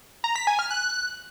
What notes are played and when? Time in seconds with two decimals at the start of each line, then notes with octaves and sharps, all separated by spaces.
0.24 A#5
0.36 B6
0.47 G#5
0.59 F6
0.70 F#6